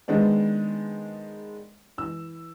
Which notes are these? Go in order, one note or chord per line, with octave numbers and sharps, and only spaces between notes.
D#3 G#3 B3 D4 C5
E3 E6